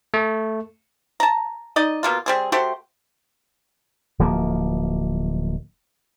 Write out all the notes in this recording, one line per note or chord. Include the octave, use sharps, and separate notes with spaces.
A3
A5 A#5
D#4 D5 D#5
B2 A#3 F4
G3 C4 G#4
A3 F#4 G4 C5
D1 F3 A#3